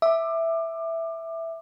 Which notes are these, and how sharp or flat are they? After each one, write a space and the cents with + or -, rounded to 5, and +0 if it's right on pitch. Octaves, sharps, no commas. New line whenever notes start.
E5 +0 D6 +25